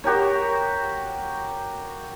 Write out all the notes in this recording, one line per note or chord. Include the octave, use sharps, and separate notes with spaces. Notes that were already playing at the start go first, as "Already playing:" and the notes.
F#4 G4 A#4 C#5